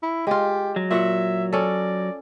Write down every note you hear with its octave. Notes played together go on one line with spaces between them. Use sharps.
E4
G#3 F4 G4
F#3
A#2 F#4 E5 F#5
C#4 A4 D5